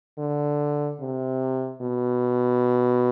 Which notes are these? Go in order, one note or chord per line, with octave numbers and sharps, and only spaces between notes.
D3
C3
B2